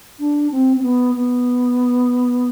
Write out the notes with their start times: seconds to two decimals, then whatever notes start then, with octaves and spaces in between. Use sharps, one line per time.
0.19 D4
0.52 C4
0.77 C4
0.83 B3
1.15 B3